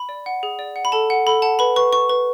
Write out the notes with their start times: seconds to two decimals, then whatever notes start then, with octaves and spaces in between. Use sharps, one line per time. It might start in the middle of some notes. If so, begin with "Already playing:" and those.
Already playing: B5
0.09 D5
0.26 F#5
0.43 G#4
0.59 D5
0.76 F#5
0.85 B5
0.92 A4 A5
1.10 F#5
1.26 A4 B5
1.42 F#5 A5
1.59 B4 B5
1.76 B4 C#6
1.93 B4 C#6
2.09 B4